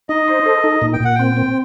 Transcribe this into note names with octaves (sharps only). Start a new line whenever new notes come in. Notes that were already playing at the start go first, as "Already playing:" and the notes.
D#4 D#5
C5
A4
D#4
A#2
G5
A#2 F#5
C4 G5
C4